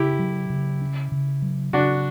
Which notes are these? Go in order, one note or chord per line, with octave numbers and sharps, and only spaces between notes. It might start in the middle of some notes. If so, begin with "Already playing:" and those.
Already playing: C#3 E4 G4
F#3
C#3
C#4
C#3
F#3
C#3 D4 F#4